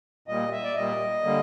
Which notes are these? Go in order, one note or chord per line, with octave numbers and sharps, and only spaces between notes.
A#2 G3 A#3 D#5
E5
D5
A#2 G3 A#3 D#5
D3 G3 A#3